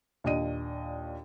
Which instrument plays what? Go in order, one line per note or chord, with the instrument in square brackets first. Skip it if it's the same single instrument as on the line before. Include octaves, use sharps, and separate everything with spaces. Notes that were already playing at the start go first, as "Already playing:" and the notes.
[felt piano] D#2 A#2 D4 D#5 D#7